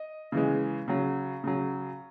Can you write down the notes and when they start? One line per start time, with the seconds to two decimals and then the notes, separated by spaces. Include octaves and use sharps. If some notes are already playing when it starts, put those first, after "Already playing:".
Already playing: D#5
0.32 C#3 E3 G#3
0.88 C#3 F#3
1.44 C#3 F#3